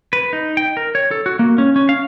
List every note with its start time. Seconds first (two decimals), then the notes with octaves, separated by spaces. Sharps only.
0.13 B4
0.33 D#4
0.57 G5
0.77 A#4
0.95 C#5
1.11 A4
1.26 F#4
1.39 A#3
1.58 C#4
1.76 C#4
1.89 F5